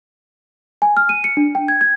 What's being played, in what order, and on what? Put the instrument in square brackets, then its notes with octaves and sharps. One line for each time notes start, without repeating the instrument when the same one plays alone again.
[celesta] G#5
F6
D#7
C#7
D4
G5
G#6
G#6